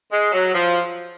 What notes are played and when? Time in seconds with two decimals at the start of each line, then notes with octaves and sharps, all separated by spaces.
0.11 G#3
0.32 F#3
0.54 F3